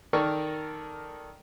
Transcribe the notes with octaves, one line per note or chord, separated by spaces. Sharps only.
D#3 A4 A#4 D5 C#6 F6